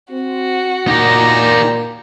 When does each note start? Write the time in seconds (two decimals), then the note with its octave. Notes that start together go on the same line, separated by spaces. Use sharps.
0.12 C4 F#4
0.88 A#2 D#4 G4 A#5